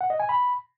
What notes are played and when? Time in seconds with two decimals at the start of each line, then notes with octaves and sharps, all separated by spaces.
0.01 F#5
0.10 D#5
0.20 G#5
0.29 B5